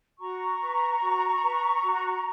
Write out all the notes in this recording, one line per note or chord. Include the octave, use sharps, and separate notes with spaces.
F#4 A#5 C#6
B4
F#4
B4
F#4